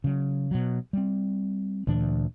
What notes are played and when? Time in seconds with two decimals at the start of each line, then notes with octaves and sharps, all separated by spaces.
0.04 C#3 F#3
0.51 B2 F#3
0.93 G3 C4
1.87 D2 A#2 E3 D4